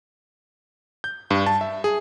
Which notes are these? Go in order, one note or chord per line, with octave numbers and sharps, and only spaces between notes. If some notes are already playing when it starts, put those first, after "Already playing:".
G6
G2
A5
E5
G#4